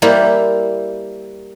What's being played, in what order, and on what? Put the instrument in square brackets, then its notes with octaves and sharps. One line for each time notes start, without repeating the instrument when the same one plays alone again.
[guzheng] G3 A#3 E4 C5